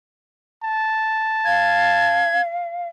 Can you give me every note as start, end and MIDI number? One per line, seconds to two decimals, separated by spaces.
0.63 2.38 81
1.45 2.87 77
1.45 2.41 92